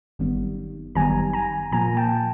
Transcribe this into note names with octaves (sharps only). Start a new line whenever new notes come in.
G1 F#2 D#3 G3 B3
G1 F#2 D#3 G3 B3 G#5 A#5
G#5 A#5
A#2 F3 A#3 G#5 A#5
G5 A5